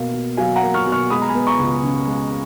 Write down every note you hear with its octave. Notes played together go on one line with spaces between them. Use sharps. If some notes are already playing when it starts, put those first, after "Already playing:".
Already playing: B2 A#3 F5
B2
F#3 F5 G#5
F#5 A#5
A#3
C#6 F6
B2
C#6 F6
G#3 B5 D#6
A#5
G#5 B5
B3
A#5 C#6
C#2
C#3
G#3